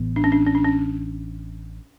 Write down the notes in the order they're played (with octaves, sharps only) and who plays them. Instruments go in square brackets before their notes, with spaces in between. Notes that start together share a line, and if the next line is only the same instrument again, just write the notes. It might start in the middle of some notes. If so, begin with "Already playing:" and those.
Already playing: [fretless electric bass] A1 A2 E3 B3
[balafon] D4
C#4
D4
C#4
D4
C#4